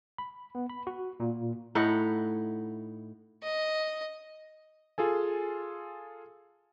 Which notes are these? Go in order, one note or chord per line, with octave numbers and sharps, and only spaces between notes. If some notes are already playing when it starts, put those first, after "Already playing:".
B5
B3
B5
F#4
A#2
A2 D#4 E4 F#5
D#5
F4 G#4 A4 G#5